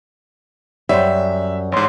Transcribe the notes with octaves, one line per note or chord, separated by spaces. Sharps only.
F#2 G3 C5 E5
A1 G#2 C#5 C6